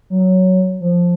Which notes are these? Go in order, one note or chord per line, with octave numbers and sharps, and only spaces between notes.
F#3
F3